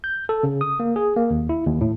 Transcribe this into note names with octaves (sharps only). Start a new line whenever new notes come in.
G6
A4
C#3
D#6
A#3
G#4
A#3
D#2
E4
D#2
A2